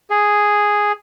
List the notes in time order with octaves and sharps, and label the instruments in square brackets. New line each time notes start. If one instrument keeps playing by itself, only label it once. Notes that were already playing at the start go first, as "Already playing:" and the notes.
[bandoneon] G#4